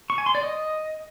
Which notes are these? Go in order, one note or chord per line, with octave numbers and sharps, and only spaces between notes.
C#6
G#5
C6
D5
D#5